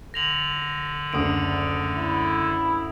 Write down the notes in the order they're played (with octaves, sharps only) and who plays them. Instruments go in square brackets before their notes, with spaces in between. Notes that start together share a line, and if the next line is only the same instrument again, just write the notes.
[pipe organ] D3 [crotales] A#6 F7 F#7
[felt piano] F#1 D2 [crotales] D#6 D7
[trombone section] E4